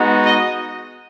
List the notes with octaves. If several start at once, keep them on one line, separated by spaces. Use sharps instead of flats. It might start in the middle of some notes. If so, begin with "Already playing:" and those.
Already playing: G#3 B3 D#4 F#4
D#5